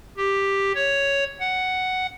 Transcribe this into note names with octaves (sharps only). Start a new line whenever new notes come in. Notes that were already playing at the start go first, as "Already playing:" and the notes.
G4
C#5
F#5